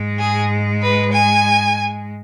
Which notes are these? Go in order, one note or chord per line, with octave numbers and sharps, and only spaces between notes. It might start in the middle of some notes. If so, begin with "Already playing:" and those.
Already playing: G#2 G#3
G#4
B4
G#5